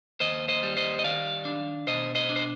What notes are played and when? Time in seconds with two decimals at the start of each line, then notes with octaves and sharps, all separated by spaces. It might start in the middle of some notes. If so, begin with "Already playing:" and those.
0.20 D#2 C5 D#5
0.48 C5 D#5
0.63 G3
0.77 C5 D#5
0.99 D#5
1.04 D#3 D5 F5
1.45 D4
1.87 B2 C5 D#5
2.15 C5 D#5
2.29 D4
2.36 C5